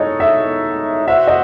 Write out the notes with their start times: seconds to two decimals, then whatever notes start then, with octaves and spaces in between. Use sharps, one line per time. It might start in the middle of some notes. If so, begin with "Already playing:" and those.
Already playing: G#3 D#4 A4 C#5 D#5
0.20 E5
1.07 F#4 C5 E5 F#5
1.27 D#5